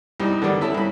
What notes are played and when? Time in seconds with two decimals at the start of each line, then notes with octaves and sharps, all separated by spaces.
0.20 C2 G3 D#4
0.42 D3 D#3 G3 B3
0.61 C#4 E4 A4
0.74 C2 B5